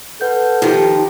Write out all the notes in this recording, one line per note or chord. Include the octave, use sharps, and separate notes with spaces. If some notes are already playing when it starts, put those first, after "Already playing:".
A4 B4 F#5 G6
D#3 F3 F4 G4